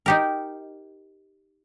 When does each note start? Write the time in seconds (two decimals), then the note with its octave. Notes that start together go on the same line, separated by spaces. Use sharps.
0.06 D#4 G4 A#4